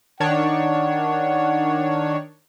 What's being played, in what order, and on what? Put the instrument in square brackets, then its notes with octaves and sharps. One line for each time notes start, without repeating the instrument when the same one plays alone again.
[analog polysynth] D#3 D4 C#5 [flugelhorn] F#5